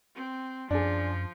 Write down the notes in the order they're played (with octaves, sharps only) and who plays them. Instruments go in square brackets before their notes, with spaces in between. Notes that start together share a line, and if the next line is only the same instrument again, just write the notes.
[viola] C4
[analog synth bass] F#2 [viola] F3 [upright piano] D4 G#4